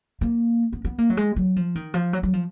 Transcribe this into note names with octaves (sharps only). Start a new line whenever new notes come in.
A#3
B3
B3
A#3
F#3
G#3
F#3
F3
D#3
F3
F#3
F#3
F3